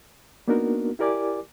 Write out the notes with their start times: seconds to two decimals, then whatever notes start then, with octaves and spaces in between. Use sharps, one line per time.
0.48 A#3 B3 D4 D#4 F#4 A#4
0.99 E4 G4 A#4 D5 G#5 D6